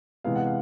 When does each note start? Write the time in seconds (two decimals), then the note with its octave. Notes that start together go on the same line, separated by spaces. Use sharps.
0.24 C3 E3 G#3 B3 F5
0.35 F#5
0.46 F5